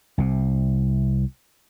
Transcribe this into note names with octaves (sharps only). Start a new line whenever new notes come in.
C2 C3